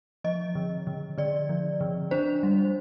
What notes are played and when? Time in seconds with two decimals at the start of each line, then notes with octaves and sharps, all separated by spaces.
0.24 F3 D#5
0.55 D3
0.87 D3
1.18 D3 D5
1.49 F3
1.81 D3
2.11 D4 C5
2.43 G3